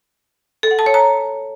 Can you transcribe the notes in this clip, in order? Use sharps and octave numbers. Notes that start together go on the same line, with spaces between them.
A4
F#5
A5
C#5
A#5